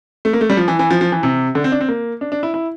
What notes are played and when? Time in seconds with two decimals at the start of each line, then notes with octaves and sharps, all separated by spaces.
0.25 A3
0.33 A#3
0.41 A3
0.50 G3
0.57 F3
0.68 E3
0.79 E3
0.91 F3
1.01 F3
1.12 E3
1.23 C3
1.55 D3
1.64 C4
1.72 D4
1.81 C4
1.88 A#3
2.21 D4
2.32 D4
2.43 E4
2.54 E4